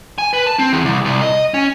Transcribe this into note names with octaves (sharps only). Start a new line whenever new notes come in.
G#5
B4
A5
C4
E2
C2
C2
D#5
C#4